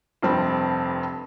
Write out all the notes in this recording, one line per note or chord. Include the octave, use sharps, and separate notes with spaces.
F1 G2 C4